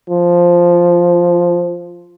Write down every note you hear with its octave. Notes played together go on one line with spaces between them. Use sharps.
F3